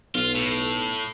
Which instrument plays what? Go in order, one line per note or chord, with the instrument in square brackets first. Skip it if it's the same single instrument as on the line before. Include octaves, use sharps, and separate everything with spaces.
[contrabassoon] B1 [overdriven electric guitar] F4
[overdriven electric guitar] A2